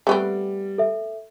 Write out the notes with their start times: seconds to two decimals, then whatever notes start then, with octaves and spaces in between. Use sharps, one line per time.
0.07 G3 A3 B3 C4
0.78 A4 E5